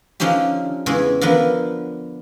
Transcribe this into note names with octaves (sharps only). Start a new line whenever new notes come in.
D3 F3 C#4 D#4 G4
E2 C#3 E3 G#3
D3 F3 B3 A#4 B4